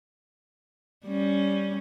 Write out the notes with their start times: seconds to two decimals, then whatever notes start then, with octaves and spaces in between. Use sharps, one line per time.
1.06 G3 C#4